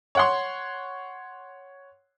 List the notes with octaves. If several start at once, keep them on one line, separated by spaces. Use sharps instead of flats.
C#5 F#5 C6